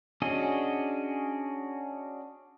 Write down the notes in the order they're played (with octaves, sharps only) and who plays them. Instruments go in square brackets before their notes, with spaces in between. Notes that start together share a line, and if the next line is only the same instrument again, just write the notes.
[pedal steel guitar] C#4 D4 F#4 G#4 D#5